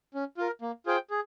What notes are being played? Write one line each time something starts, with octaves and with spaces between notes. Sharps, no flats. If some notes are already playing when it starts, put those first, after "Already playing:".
C#4
F4 A#4
A#3
F4 G#4 C5 G5
G#4